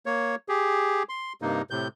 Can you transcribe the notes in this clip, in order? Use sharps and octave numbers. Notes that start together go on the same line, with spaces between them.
A#3 C#5
G4 G#4
C6
G2 C3 A#3 D#4
A2 C3 G6